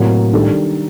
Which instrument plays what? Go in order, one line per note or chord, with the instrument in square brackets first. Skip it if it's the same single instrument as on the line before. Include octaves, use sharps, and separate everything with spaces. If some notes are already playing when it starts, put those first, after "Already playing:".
Already playing: [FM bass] A2 [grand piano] C3 F#3 A#3
[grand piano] D#3 G3 D4 A4